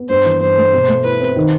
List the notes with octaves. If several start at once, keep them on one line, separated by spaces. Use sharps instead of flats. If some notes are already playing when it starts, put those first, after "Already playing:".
Already playing: B3
G2 C5
E3
G2 C5
A3
B2
A3
E4 B4
C4
D#3